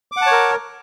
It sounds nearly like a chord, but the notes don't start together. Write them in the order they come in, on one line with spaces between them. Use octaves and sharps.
D6 F#5 A5 C#5 A#4